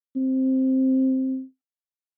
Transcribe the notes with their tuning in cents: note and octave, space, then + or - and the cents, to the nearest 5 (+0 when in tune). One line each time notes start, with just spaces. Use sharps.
C4 +5